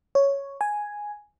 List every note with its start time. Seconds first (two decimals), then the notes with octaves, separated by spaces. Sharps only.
0.15 C#5
0.61 G#5